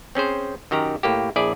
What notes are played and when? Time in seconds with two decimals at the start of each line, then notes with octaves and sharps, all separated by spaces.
0.15 C4 C#4 G#4 C5
0.71 F#2 D#3 G4 A#5
1.03 A2 A#3 G4
1.36 A#1 E4 G#4 D5